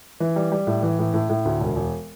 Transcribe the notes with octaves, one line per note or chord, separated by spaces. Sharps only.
E3
G3
G3
A2
E3
A2
A2
A2
D2
E1
E1